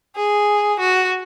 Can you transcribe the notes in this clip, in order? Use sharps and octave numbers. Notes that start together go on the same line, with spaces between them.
G#4
F#4